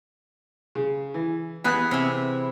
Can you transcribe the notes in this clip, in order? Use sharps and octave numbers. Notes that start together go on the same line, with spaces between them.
C#3
E3
E3 B3 G#4 B4 F#6
C3 E4